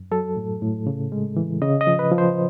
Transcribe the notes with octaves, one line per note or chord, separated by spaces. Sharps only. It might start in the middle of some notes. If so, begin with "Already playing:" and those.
Already playing: F#2
F#3 A4
A2
A2
C#3
G#3
E3
C#3 D#5
D#5
F3
B4
F3
C5